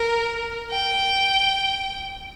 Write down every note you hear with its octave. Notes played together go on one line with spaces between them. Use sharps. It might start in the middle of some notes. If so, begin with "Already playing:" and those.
Already playing: A#4
G5